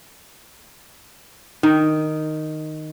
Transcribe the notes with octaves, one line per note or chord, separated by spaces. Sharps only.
D#3